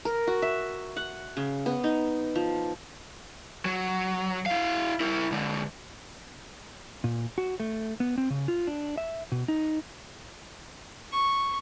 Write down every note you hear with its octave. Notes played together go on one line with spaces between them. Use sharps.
A#4
F#4
E5
F#5
C#3
B3
D#4
F3
F#3
E4 F5
E4 A#4
D3 G#3
A#2
F#4
A3
B3
C4
C#3
F4
D4
E5
B2
D#4
C#6